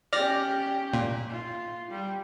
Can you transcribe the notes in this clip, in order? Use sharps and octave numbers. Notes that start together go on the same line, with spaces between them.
C#4 G4 D5 F6 A#6
A#2
F4
G3